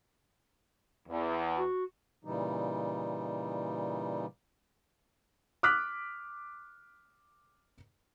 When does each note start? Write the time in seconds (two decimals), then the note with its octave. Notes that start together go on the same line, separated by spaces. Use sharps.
1.09 E2
1.58 F#4
2.25 A#2 C#3 E3 G3 D#4
5.63 D6 D#6 F6 F#6 B6